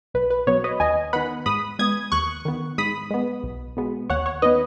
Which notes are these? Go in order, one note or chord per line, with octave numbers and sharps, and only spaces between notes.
B1 B4
B4
B2 F#3 B3 C#5
B4 D#5
D#2 D#5 G#5
D#3 B3 F#5 B5
G#2 B5 D#6
G#3 B3 D#6 G#6
D#2 C#6 F#6
D#3 B3
G#2 B5 D#6
G#3 B3
B1
B2 G#3 B3
D#2 C#5 F#5
C#5
D#3 B3 B4 D#5